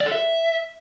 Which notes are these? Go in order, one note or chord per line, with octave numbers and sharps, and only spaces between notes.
D5
A4
E5